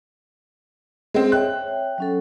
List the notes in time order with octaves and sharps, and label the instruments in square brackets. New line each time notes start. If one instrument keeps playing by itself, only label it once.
[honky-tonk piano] G#3 C4
[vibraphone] C#5 E5 G5 [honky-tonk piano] F#6
[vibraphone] F#3 C#4 A4